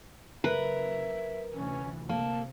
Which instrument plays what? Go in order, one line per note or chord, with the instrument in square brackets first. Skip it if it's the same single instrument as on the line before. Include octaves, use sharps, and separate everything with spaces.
[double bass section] F#1 [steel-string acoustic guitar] A#4 [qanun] B4 [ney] E5
[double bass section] F1 D2 E3 [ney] C#4
[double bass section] C3 [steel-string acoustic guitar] A#3 [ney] A5